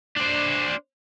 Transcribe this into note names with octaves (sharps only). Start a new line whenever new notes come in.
D4 C5